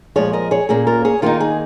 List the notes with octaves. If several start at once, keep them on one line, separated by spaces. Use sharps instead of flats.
A#2 F3 G#3 G#4 C#5
A#4 D#5
G#4 C#5
A#2 A#3 C#4 G#4
F4 A#4
G#4 C#5
D#3 A#3 D#4 F4 A#4
G#4